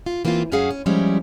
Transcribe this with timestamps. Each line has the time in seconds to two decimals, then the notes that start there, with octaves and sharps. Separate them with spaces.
0.06 F4
0.25 E3 A#3 C4 E4 F4
0.52 F#2 C#4 F#4 G#4 F5 F#5
0.70 C#4
0.86 F3 G3 G#3 C#4 E4